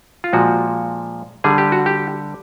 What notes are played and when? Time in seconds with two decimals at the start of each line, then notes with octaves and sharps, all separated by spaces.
0.24 F4
0.33 A#2 F3 G#3 F#4
1.44 D3 G3 G#4
1.58 G4
1.72 F#4
1.86 G4